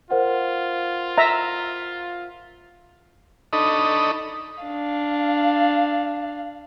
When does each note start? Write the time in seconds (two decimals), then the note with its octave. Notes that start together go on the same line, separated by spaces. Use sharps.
0.11 F4 A#4 C5 F#5
1.18 E5 A#5
3.53 D4 D#4 A4 D#5 B5 C#6
4.63 D4 F5